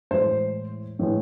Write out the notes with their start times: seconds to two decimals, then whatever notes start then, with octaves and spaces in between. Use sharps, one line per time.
0.11 A2 E3 G#3 C5
0.99 A2 E3 G#3